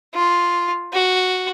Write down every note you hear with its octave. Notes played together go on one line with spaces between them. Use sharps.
F4
F#4